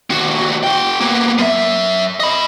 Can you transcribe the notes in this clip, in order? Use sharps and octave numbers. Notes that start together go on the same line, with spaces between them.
D#2 F#4
F#4 G5
A#3 B3
F#2 E5
D#5 B5